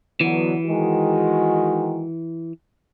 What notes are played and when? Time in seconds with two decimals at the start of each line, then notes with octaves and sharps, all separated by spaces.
0.21 D3 E3 F#3 B3
0.66 D#3 G#3 F#4